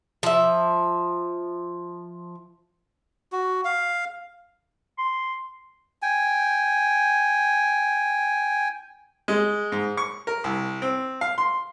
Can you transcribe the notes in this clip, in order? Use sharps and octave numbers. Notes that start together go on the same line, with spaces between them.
F3 E5
F#4
F5
C6
G5 G#5
G#3
G#2
C#6
A#4
C2
C4
F5
C6